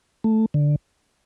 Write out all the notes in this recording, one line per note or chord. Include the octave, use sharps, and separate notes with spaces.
A3
D3